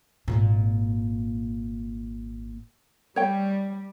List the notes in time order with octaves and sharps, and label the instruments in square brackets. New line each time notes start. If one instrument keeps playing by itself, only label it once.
[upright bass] G#1 A#2
[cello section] G3 [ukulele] C#5 G5